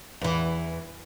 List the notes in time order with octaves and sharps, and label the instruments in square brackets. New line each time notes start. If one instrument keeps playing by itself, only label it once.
[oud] E2 E3